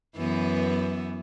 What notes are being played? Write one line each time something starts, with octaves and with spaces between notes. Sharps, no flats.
F#2 E3 B3